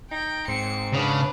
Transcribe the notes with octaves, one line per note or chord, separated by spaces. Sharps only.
D#4 G5
G#2 C4 C#7
C#3 D4 B4